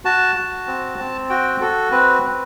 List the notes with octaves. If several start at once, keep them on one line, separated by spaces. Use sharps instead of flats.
F#4 A5
F#4
C4
C4
F#4 G5
F#4 A4
C4 B4
C4